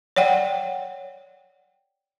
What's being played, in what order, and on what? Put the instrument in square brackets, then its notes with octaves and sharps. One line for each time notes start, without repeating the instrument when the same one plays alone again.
[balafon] C#5 D5 F#5 G5